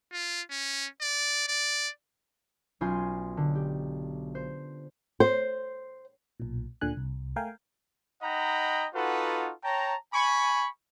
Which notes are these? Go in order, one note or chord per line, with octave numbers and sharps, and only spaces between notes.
F4
C#4
D5
D5
B1 C#4 F4 G#5 C6 G6
D3
G4
C5
C5
B1 A#2
D2 A#2 D3 G#5 F#6
C2
A3 A#4 F5 G5 G#5
D#4 D#5 F#5 G5 A#5 B5
D#4 F4 F#4 A4 B4 F#5
C#5 G5 A5 A#5
G#5 B5 C#6